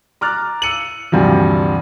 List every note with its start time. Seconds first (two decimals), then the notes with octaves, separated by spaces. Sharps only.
0.21 A#5 D6 F6 F#6 A6
0.62 E6 C#7 D#7 F#7
1.12 D2 G2 C3 E3 F3